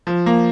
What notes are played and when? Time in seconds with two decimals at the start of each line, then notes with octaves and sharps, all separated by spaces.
0.07 F3
0.26 A#3